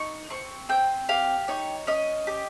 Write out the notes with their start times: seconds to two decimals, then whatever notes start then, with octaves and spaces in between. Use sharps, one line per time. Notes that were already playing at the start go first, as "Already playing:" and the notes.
Already playing: D#4 C#6
0.30 C4 C#6
0.69 C4 G5
1.09 G4 F5
1.48 D#4 C#5
1.87 C#4 D#5
2.27 G4